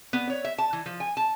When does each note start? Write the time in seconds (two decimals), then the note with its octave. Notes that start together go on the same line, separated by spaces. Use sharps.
0.13 B3
0.30 C#5
0.45 E5
0.58 A5
0.73 E3
0.86 F3
1.00 G#5
1.17 A5